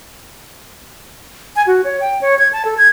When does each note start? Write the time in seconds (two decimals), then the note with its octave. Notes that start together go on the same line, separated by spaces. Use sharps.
1.56 G#5
1.67 F#4
1.84 C#5
2.01 G5
2.21 C#5
2.39 G#6
2.53 A5
2.65 A4
2.78 G#6